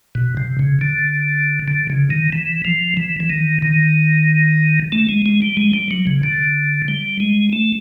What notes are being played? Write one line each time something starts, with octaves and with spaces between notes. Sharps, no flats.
B2
C3
C#3
D3
D3
C#3
D#3
E3
F3
E3
E3
D#3
D#3
A3
G#3
G#3
G3
G#3
G3
F#3
C#3
D3
G3
G#3
A3